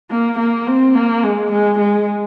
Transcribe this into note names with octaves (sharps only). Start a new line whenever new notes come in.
A#3
A#3
C4
A#3
G#3
G#3
G#3